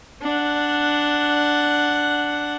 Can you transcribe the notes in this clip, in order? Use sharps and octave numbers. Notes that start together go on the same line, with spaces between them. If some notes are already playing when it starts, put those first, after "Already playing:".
D4 F#5